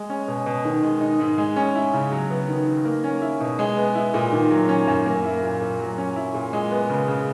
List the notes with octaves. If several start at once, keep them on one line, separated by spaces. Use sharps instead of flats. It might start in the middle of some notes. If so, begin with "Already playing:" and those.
Already playing: G#3
C#4
B2
B2
D#3
G#3
D#4
G#2
G#3
C#4
E4
C#3
F#3
B3
D#3
D#3
A#3
C#4
E4
B2
G#3
B3
E4
A#2
D#3
F#3
C#4
F#2
A#3
E4
A#2
A#2
F#3
C#4
E4
A#2
G#3
B3
C#3
C#3